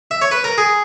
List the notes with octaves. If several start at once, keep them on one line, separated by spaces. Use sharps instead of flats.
E5
C#5
B4
A#4
G#4